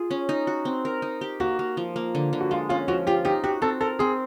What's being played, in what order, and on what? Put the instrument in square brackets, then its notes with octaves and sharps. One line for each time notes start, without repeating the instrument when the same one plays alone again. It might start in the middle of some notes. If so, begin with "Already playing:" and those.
Already playing: [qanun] F4 G#4
C#4
D#4
F#4
C4
A#4
D#4
G4
[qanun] A#3 [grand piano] F#4
[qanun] A#3
F3
A#3
D3
D3
[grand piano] F#4
[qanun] G#3 [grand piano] F4
[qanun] C#4 [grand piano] F4
[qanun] F3 [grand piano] F#4
[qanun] F4 [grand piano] G4
[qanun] D#4 [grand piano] G4
[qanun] F#4 [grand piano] G4
[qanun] C4 [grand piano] A4
[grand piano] A4 [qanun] A#4
[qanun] C4 [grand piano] G#4